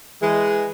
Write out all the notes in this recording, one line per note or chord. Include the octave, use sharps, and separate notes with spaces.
E3 G#3